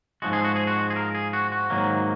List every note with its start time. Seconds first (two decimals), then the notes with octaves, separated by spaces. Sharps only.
0.22 G#2 F3 G#3 F#4
0.33 G#4
0.44 F#4
0.56 G#4
0.67 F#4
0.90 G#4
0.96 A#4
1.14 G#4
1.33 F#4
1.52 F#4
1.70 G#2 D#3 F#3 A#3